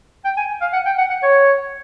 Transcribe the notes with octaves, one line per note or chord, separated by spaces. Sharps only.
G5
G#5
F5
F#5
G5
F#5
F#5
C#5